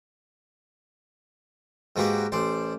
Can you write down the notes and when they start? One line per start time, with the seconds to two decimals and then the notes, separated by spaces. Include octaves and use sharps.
1.96 G#2 G#3 A#3 F#4 G4 B4
2.32 A1 C5 D5